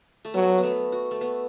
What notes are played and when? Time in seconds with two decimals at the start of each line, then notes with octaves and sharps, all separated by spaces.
0.25 A3
0.34 F#3 B3
0.58 B3
0.63 A3
0.92 F#4
1.11 A3
1.21 B3